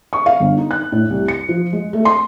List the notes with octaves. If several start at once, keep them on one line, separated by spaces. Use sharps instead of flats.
C#6
F5
G1
D#4
F#6
A2
C2
C#7
F3
G#3
A3
C6